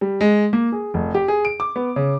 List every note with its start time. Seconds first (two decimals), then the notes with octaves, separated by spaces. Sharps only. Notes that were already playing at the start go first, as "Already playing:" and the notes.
0.01 G3
0.21 G#3
0.53 A#3
0.72 G#4
0.94 F1
1.14 G4
1.28 G#4
1.45 D7
1.60 D6
1.76 B3
1.96 C#3